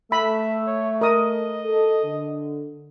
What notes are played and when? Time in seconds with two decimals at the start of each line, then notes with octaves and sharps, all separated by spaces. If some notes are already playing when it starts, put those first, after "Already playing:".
0.12 A3 E5 B5
0.67 C#5
1.01 A#4 D#5 D#6
1.65 A4
2.03 D3